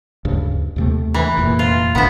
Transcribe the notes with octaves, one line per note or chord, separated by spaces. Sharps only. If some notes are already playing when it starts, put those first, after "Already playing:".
D2 G2 C#3
D#2 C3 A3
E3
F1 E2 A#2
F4
G1 B2 D3 B3 E4